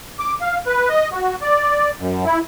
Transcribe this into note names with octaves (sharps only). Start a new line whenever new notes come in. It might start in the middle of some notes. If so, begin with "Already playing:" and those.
D6
F5
B4
D#5
F#4
D5
F#2
E4